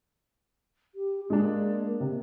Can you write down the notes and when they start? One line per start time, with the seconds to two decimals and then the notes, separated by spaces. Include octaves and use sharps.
0.95 G4
1.30 G#3 A#3 D4
2.00 C3